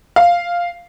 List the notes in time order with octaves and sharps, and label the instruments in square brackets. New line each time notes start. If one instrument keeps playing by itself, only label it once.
[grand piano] F5